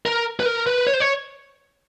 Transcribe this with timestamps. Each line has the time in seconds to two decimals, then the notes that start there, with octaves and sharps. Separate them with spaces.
0.06 A#4
0.40 B4
0.46 A#4
0.66 B4
0.87 C#5
0.94 C5
1.00 C#5